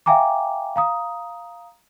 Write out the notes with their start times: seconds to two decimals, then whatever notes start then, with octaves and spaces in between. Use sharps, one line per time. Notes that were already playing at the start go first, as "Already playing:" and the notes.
0.06 E5 F5 G5 G#5 A#5 D6
0.76 F5 A#5 D#6